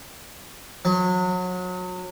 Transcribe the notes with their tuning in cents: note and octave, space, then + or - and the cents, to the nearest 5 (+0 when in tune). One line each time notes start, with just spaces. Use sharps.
F#3 -30